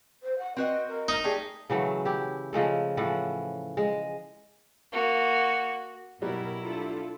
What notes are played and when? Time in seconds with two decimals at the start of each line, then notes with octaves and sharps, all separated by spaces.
0.23 C5
0.39 F#5
0.56 C4 F#4 B4 D#5
0.87 A#4
1.08 D#4
1.24 A3 G4 G#4 D5
1.70 C#3 E3 F#3 A3
2.05 E4 G4
2.53 C#3 F3 G#3 A3
2.97 A2 E3 F3 F#5
3.77 G#3
4.92 A#3 F#4
6.22 B2 F#3 G3 E4 F#4 A#4
6.62 D4 F4 A4